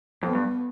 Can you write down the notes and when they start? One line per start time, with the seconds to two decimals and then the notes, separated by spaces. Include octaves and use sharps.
0.23 F2 B3
0.35 G2